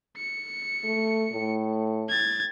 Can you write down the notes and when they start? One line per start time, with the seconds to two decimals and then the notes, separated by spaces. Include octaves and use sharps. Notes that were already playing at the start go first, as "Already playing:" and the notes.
0.17 C#7
0.84 A3
1.32 A2
2.09 G#6 A6